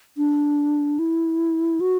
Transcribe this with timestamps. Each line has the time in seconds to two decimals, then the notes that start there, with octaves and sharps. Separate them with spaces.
0.17 D4
0.99 E4
1.80 F#4